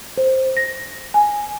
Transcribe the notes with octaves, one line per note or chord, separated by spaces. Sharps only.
C5
A#6
G#5